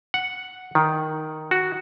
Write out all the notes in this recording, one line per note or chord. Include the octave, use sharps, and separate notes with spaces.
F#5
D#3
F#4